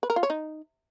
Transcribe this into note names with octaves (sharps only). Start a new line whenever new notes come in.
B4
A#4
F4
C#5
D#4